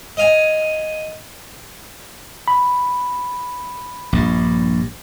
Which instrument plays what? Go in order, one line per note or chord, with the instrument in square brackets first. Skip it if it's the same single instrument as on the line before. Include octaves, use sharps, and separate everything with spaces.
[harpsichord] D#5 F5 G#5
[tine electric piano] B5
[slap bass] A#1 G2